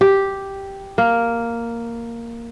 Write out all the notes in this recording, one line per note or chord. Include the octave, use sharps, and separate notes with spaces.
G4
A#3